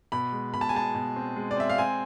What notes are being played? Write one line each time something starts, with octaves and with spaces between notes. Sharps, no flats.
B2 B5
G#3
B2 B5
A5
G#5
G#3 A5
B2
C4
G#3
D5
C4 E5
F5
C4 G#5